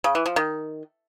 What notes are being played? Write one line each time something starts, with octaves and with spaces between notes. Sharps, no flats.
C#3
E3
F3
D#3